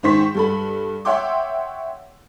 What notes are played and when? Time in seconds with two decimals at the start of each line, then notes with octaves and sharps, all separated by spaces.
0.03 G#2 D#3 C5 C#6 B6
0.35 G2 A4 B5
1.05 C#5 E5 F#5 G5 C6 D6